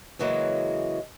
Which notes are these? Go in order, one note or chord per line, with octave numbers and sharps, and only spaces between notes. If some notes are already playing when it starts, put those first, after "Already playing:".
C#3 E3 F#3 G#3 A#3